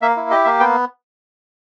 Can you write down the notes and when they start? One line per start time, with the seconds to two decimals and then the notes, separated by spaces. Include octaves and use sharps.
0.02 A#3 E5
0.17 E4
0.30 G4 D#5
0.45 A#3 E5
0.60 B3 G5